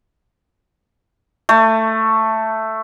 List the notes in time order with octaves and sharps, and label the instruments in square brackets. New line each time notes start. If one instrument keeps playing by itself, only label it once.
[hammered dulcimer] A3